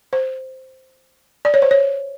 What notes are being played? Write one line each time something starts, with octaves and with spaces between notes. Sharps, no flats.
C5
D5
C#5
C5
C#5